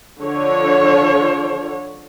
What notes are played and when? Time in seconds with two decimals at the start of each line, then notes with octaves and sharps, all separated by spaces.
0.20 D3 F3 C#5